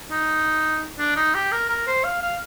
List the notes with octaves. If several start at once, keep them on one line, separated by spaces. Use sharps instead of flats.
D#4
D4
D#4
G4
A#4
A#4
C5
F5
F5